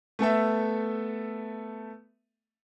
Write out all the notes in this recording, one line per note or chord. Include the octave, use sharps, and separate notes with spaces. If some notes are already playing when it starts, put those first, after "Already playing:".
A3 B3 A4 E5